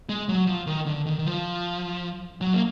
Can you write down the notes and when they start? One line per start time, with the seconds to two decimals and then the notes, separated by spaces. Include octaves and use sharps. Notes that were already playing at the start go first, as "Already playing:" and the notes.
0.09 G#3
0.29 F#3
0.47 F3
0.67 D#3
0.86 D3
1.06 D#3
1.19 D#3
1.25 F3
2.41 F#3
2.53 A#3